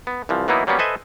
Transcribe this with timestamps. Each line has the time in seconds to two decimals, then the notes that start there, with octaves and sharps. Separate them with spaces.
0.07 B3
0.29 C2 E3 F3
0.48 E3 F#3 A#3 B3 D#4 E4
0.67 F#3 G3 A#3 B3 C#4
0.79 A4 B4 C5 D#5 E5 G#5